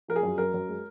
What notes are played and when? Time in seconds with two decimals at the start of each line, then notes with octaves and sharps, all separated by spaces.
0.08 F3 A#4
0.16 G#4
0.23 F#2
0.38 F#2 A#4
0.54 F#2
0.68 G#3